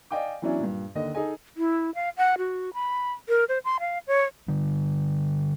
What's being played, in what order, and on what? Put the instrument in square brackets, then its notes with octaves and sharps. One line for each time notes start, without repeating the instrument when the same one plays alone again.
[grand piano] D5 D#5 F5 G5 G#5 D6
E3 F#3 B3 C#4 D4 E4
G2 A#2
D#2 D3 D#5
D#4 G#4 A4 D#5 G#5
[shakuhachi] E4
F5
F#5
F#4
B5
A#4
C5
C6
F5
C#5
[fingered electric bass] D3 G3